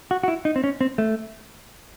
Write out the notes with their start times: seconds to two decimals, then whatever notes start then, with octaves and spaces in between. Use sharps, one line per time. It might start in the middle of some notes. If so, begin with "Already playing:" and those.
0.11 F#4
0.23 F#4
0.28 E4
0.45 D#4
0.56 C4
0.64 C#4
0.81 C4
0.98 A3